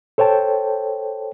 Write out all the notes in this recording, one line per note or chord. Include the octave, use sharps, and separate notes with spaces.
A4 C5 C#5 G5 A5